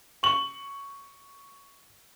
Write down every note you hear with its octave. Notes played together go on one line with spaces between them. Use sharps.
C#6 F#7